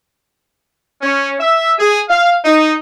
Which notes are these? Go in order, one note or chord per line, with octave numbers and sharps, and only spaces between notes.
C#4
E5
G#4
F5
D#4